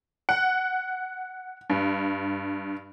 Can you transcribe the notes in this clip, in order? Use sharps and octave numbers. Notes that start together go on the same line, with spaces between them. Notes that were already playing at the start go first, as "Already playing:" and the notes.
F#5
G2